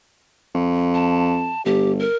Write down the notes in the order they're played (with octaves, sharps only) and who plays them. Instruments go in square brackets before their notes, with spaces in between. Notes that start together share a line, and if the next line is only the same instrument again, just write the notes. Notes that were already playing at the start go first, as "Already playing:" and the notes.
[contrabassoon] F2
[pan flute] A5
[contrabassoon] G1 [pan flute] G4
[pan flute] A#4